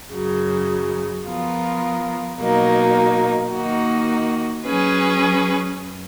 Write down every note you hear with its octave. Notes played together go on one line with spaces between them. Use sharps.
F#2 C#3 F#3
F3 B3 F4 A#4
B2 F#3 A#3 D#4
D#3 A#3 D#4 F#4
F#3 C#4 G#4 B4
F#2